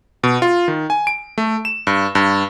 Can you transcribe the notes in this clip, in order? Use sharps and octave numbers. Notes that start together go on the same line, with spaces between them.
B2
F4
D#3
G#5
D7
A3
E7
G2
G2